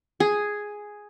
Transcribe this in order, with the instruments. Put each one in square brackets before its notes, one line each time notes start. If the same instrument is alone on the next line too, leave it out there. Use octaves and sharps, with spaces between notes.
[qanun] G#4